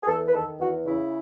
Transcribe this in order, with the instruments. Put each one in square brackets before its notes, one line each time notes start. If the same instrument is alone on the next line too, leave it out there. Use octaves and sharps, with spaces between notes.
[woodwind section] G#4
E2 A4
B4
D#3 A4
E2 F#4
C#3 E4